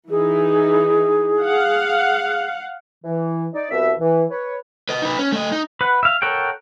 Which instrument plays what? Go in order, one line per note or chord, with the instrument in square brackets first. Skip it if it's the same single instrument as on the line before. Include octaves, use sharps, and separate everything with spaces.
[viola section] E3 D#4 E4 [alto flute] G#4
[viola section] F5 F#5
[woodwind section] E3
D#4 D5
C2 B2 E5
E3
B4 C#5
[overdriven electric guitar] B4 D#5
D#4 B4
C#4
A3 D#5
D#4
[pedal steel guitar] B4 F#5
E5 F5
A4 A#4 C#5 F#5 G5